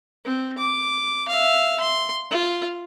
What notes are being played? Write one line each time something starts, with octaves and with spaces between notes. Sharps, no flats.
C4
D6
E5 F5
C6
F4